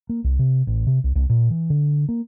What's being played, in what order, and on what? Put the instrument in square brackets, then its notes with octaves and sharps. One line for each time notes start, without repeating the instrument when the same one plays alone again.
[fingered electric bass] A#3
C2
C3
A1
C3
C2
C2
A#2
E3
D3
A#3